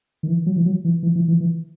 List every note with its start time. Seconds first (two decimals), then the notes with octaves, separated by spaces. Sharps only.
0.23 D#3
0.28 E3
0.46 F#3
0.56 E3
0.66 F#3
0.85 E3
1.03 E3
1.16 E3
1.28 E3
1.40 E3